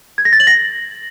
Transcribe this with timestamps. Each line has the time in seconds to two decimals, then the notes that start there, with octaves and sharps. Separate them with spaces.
0.18 G#6
0.25 A#6
0.33 A6
0.40 F#7
0.47 A#6